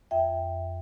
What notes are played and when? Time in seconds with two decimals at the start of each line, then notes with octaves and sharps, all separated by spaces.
0.11 F2 E5 G5